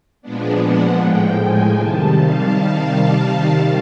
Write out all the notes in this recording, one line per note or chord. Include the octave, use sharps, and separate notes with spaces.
A#2 F3 G#3 B3 D4
F#5
A2 F3 G#3 G5
G#5
C3 D#3 G3 A5
F5